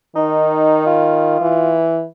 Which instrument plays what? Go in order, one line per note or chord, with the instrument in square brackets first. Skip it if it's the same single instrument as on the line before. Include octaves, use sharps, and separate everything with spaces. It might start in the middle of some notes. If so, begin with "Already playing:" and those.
[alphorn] D#3 [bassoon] D#4
[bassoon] F4
[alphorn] E3